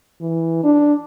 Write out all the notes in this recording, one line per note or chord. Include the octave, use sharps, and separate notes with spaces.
E3
D4